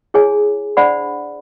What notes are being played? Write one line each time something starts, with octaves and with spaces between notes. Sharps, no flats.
E4 G#4 C#5 G#5
D4 C5 D5 F#5 B5